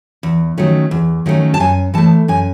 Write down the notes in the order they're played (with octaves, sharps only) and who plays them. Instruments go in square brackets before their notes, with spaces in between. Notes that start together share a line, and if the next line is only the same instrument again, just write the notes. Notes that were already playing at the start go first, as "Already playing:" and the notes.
[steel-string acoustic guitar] E2
D#3 F#3 A3 C#4
E2
D#3 F#3 A3 C#4
A5
F#2 G#5
E3 A3 A5
F#2 G#5